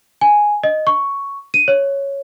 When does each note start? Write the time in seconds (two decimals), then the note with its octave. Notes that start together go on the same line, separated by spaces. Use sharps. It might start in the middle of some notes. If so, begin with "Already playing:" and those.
0.21 G#5
0.64 D#5
0.87 C#6
1.54 D#7
1.68 C#5